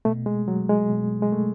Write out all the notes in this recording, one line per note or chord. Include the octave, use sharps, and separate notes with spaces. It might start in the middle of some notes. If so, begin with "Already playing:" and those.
B2 A3
G#3
F#3
G#3
B2
G#3
A3